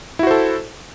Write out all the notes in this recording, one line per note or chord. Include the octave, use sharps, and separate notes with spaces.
E4 F#4 A4 C5